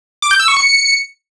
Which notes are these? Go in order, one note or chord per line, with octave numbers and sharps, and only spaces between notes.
D6
G6
E6
C#6
C#7